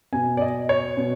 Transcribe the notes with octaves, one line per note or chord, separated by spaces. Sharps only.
B2 G#5
D5
D#5
C#5
B2